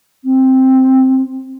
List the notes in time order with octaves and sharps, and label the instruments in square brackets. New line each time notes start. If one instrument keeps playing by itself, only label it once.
[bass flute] C4